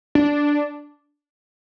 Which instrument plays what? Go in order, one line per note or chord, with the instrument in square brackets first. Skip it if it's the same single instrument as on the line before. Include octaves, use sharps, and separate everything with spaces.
[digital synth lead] D4